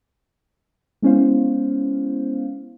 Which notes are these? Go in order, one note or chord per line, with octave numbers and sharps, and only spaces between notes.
G#3 B3 C#4 E4 C5 F5